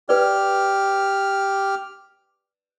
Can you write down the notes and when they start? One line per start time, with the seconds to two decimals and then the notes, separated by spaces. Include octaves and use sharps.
0.09 G4 B4 D5 F6